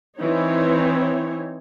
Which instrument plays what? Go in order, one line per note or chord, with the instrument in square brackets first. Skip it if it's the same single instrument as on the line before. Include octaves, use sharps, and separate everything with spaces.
[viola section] E3 C4 D#4 C#5